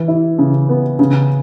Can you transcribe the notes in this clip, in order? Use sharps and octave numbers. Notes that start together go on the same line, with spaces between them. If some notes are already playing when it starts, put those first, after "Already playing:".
Already playing: E3
E4
C#3
B3
C#3